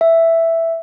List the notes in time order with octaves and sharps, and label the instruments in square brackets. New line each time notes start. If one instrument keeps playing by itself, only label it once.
[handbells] E5